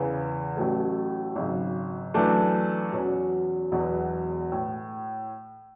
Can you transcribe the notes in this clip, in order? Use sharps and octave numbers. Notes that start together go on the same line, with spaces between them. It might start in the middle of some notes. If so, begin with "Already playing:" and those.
Already playing: E2 C#3 E3
A1 A2 F#3 A3
G#1 F#2 C#3
F#2 E3 A3 D4
E2 B2 F#3 C#4
E1 E2 B2 F#3
A2